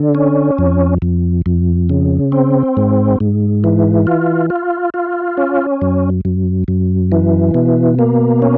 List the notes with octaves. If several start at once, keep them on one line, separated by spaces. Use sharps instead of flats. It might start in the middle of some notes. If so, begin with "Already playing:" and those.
Already playing: D3
C#4
F2
F2
F2
C#3
C4
G#2
G#2
E3
F4
F4
F4
C#4
F#2
F#2
F#2
E3
B2
A#3
C#4